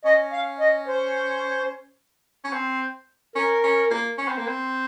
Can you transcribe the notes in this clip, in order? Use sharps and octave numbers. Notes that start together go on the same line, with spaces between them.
C#4 D#5
F5
D#5
C5
C#4
C4
C#4 A#4
C#4
A#3
C#4
C4
A#3
C4